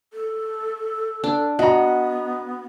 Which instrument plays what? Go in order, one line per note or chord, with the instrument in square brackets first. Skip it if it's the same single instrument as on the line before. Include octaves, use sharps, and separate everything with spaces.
[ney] A4
[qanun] D4
[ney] B3 [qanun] F#4 [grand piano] D#5 A#5